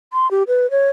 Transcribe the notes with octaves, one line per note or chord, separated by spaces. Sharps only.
C6
G4
B4
C#5